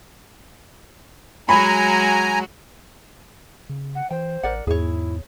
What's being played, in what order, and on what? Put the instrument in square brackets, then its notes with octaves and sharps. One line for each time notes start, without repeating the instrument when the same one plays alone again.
[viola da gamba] F#3 G#3 F#4 [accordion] G#5 A#5 [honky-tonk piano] B5
[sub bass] C#3
[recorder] F#5
[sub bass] E3 [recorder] C5 [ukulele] G5
[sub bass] A1 [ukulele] A#4 D5 F#5
[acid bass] E2 [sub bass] G#2 [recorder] E4 [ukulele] G#4 C#5